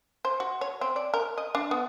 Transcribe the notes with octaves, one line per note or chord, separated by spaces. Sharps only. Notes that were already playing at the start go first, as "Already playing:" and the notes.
C5
F#4
C#5
C4
D5
A#4
D#5
D4
B3